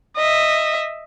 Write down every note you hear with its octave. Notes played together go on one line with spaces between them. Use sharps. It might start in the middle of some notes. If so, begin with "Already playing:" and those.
D#5 E5